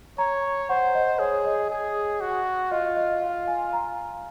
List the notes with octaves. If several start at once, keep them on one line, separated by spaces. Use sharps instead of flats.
C#5 A#5
C5 F#5
D#5
G#4 C#5
D#5
G#4
F#4
F4 D#5
D#5
F5
G#5
A#5